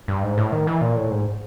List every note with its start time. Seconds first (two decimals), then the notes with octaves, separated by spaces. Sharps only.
0.08 G2
0.23 G#2
0.38 A2
0.52 D#3
0.67 E3
0.81 A#2
0.96 A2
1.11 G#2